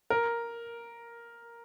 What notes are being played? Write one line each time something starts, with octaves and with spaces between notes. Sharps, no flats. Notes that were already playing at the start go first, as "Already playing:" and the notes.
A#4